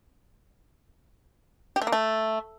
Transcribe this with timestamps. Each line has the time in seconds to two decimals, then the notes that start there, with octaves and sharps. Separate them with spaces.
1.76 G4
1.82 A3
1.87 A#3
1.92 A3